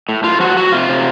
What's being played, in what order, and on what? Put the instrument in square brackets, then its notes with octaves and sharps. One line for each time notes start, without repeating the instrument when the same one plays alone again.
[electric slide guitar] A2
A2 F4
F3 F#4
F3 F#4
C3 F4
C3